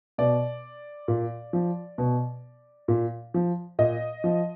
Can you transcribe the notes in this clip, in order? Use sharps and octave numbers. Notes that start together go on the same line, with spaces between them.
B2 D5
A#2
F3
B2
A#2
F3
A#2 D#5
F3